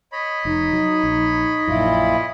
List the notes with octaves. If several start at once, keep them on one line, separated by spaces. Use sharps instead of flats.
C#5 D#5 B5
F1 D#4
F#3
A#1
A#1 F#2 A#2 E4 F4